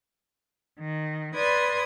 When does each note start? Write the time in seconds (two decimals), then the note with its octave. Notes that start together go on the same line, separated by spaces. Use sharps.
0.79 D#3
1.34 B4 D5 C6 D#6 G#6